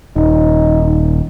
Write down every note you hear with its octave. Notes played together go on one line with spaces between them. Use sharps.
D#1 D#4